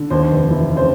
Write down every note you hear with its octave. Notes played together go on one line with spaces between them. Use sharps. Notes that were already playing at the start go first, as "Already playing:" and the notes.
Already playing: D3
D#2 C5
F1
E3
C#3
C5